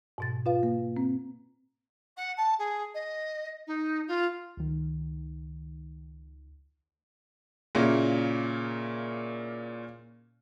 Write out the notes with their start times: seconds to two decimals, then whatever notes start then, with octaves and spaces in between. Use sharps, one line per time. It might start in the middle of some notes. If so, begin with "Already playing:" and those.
0.18 G#2 B2 A6
0.46 F4 B4 F5
0.63 A#3
0.97 C4
2.17 F#5
2.37 A5
2.58 G#4
2.94 D#5
3.67 D#4
4.08 F4
4.57 C#2 D#3
7.75 A#2 C#3 A#3 C#4 E4